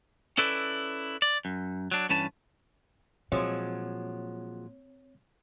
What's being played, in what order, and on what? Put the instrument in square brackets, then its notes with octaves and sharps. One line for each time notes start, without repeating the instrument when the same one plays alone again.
[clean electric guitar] C#4 E4 A4 B4 D5
D5
F#2
F#3 D4
G2 E3 C#4 B4 A5
[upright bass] A#2 [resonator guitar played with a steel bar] F3 F#3 G#3 [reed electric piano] C4 C#5